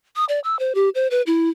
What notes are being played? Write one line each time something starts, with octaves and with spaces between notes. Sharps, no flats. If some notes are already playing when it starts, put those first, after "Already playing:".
D#6
D5
E6
C5
G4
C5
B4
E4